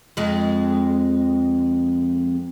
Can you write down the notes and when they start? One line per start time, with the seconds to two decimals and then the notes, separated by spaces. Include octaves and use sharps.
0.17 F2 G#3